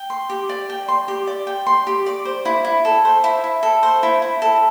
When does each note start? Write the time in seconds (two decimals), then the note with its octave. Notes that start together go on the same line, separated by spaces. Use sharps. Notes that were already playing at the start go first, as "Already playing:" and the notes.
Already playing: G5
0.10 C6
0.30 G4
0.49 D5
0.70 G5
0.88 C6
1.08 G4
1.27 D5
1.47 G5
1.67 C6
1.87 G4
2.06 D5
2.25 C5
2.45 E4
2.65 E4
2.85 A4
3.05 C5
3.24 E4
3.44 E4
3.63 A4
3.83 C5
4.03 E4
4.22 E4
4.42 A4